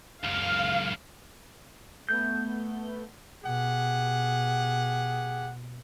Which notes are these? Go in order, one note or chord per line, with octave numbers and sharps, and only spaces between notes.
C#2 F#2 F5
A3 B3 G6
B2 G4 G#4 F#5